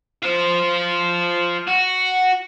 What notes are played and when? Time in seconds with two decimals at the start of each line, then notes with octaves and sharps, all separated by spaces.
0.22 F4 C5
1.67 F#4